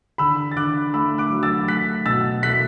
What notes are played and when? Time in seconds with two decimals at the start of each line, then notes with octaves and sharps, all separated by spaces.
0.18 D3 B5 E6
0.51 A6
0.56 D3 D6 F#6
0.94 A3 B5 E6
1.18 D6 F#6
1.30 F#3
1.43 E6 A6
1.68 A3 F#6 B6
2.06 B2 E6 A6
2.43 A3 F#6 B6